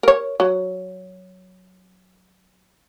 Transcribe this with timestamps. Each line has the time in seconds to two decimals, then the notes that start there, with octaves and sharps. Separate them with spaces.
0.03 A#4 C#5
0.40 F#3